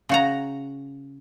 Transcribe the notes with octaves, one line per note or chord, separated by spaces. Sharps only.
C#3 F#4 A#5